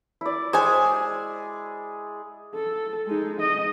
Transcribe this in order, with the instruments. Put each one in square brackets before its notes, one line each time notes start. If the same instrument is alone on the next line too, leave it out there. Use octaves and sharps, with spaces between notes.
[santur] E4 D5
[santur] G#3 G#4 [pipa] C5 C#5 G#5
[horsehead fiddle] A4
G#3 D#4
D#5